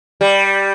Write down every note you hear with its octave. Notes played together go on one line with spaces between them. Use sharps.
G3